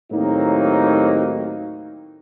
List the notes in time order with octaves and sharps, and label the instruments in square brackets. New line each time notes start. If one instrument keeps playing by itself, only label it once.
[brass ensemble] D#2 A2 F#3 A#3 C4 D#4